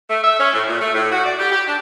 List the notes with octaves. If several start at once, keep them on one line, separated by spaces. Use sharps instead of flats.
A3
E5
C#4
A2
A#2
A3
A2
F#4
D5
G4
G4
D4